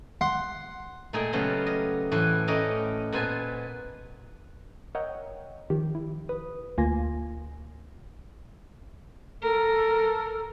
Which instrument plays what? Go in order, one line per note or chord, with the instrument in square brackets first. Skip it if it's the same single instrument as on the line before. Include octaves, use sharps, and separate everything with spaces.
[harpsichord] F#5 C6
[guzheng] A#2 A3 D#4 G#4 G5
C#3 F#3 A3 B3 F4 G4
D#5
A2 E3 B4 C5
A3 C#4 D#4 D5 D#5 G5
A#2 B3 B4 C5 G#5 A5
[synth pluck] A#4 C#5 D#5 E5 F#5 G5
D#3 F3 G4
E4
B4 D#6
D2 A#3 F4 G#5 C6 A#6
[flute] A4 [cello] A#4